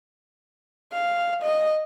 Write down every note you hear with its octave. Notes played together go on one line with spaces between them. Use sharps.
F5
D#5